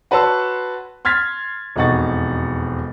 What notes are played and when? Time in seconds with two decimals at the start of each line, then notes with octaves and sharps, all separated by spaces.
0.11 F#4 B4 C#5 A5 C6 E6
1.05 C6 F6 G#6 A6 B6
1.76 E1 F2 D#4 F#5 C#6 A6